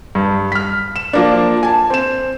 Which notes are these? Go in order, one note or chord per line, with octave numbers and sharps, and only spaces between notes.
G2
F6 B6
E7
F3 A#3 D4
G#5 A5
C4 E7